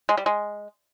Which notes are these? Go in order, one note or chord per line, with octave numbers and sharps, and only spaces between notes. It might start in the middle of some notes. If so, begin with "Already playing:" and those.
G#3
G3
G#3